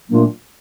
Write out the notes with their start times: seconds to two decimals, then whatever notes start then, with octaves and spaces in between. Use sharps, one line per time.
0.10 A#2 F#3 A3 A#3 D4 F4